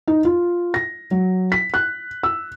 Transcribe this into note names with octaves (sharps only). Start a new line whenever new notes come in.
D#4
F4
A#6
F#3
B6
F#6
E6